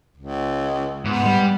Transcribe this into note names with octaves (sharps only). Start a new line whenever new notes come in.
C#2
G#2 B3
G3